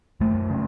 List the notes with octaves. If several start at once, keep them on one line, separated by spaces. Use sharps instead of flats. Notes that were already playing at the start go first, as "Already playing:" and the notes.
F#2 A3
C#3